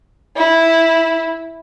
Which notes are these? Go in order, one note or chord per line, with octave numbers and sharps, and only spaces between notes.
E4